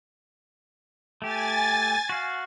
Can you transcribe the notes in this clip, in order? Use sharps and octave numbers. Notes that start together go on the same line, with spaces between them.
A3 G4 G#5 A6
F#4 F5